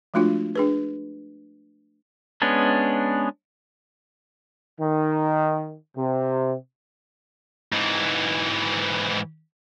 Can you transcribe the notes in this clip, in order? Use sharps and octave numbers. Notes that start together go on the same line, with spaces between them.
F3 G#3 A3 D4 F4 F#4
D4 G#4 B4
G#3 B3 C#4 D4
D#3
C3
G#2 E3